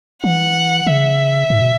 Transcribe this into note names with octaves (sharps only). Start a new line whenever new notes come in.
E3 F#5
C#3 E5
G#2
B2